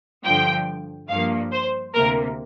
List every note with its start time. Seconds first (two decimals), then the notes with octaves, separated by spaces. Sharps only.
0.25 G2 D3 F3 G5
1.09 G2 F3 A#3 F5
1.52 C5
1.93 D2 C3 A#3 A#4